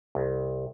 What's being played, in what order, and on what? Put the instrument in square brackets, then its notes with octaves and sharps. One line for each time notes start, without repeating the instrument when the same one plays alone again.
[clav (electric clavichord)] C2